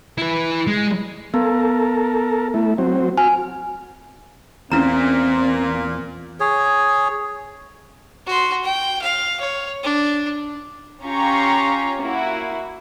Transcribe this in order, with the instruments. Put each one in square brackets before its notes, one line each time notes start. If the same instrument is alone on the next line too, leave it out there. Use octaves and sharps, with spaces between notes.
[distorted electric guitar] E4 B4
G#3
[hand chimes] B3 [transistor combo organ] A4 A#4
[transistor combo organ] A3 E4
F#3 C4
[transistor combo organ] F#4 F6 [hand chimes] G#5
[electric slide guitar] E2 [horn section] A#2 [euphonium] C4 [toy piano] C#4 E4 A#5
[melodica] G#4 C#5
[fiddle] F#4 C6
G5
F5
C#5
D4
[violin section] C#4 F4 G4 F5 A#5 C#6
A#3 E4 F#4